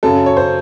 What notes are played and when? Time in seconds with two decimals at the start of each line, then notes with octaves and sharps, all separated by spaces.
0.03 F#2 C#3 A4
0.26 C#5
0.37 C5